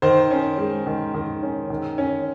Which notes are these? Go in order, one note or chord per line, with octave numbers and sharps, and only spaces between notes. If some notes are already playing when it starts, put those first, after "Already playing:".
D#3 C5
C#4
G#3
D#3
D#3
C#4
D#3
C#4